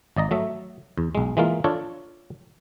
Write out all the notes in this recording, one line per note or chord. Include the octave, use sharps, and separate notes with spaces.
G#1 D5 D#5 A#5
F#3 A3 E5
E2
B1 G#3
E3 G#3 A#3 F4
D4 F4 A4 C#5